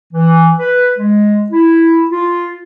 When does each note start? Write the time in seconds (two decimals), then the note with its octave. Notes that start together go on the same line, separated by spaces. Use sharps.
0.13 E3
0.59 B4
0.98 G#3
1.50 E4
2.11 F4